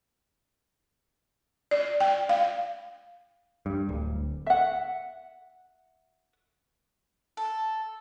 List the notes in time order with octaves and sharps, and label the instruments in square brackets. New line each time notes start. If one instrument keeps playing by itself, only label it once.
[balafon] D5
G5
F5
[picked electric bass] G2
D1
[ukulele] E5 F#5
[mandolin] A4